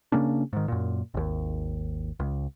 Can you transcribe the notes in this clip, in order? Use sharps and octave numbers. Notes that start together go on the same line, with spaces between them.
C#3 A#3 C#4 D4
G#2 D#3
F#2 A#2
G#1 D#2
C#2